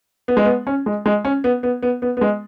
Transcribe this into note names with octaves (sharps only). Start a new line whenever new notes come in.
B3
G#3
B3
C#4
G#3
G#3
C#4
B3
B3
B3
B3
B3
G#3